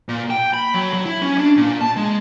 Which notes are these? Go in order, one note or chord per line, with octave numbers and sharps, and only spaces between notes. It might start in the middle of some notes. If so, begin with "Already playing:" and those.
A#2
G5
B5
F#3
F#3
E4
C#4
D4
A#2
A5
G#3